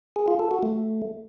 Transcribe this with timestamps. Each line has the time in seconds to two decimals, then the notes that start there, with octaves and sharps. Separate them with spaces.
0.16 G#4
0.28 F4
0.39 A4
0.51 F#4
0.63 A3